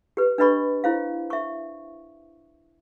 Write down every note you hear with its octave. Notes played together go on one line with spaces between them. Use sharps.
G4 B4
D4 B4 D#5 B5 C#6
E4 C5 F5
E5 C#6